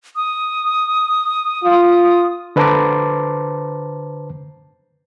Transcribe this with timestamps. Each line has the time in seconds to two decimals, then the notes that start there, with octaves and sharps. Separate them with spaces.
0.16 D#6
1.64 F4
2.56 D3 B4 C5 A5 A#5 D6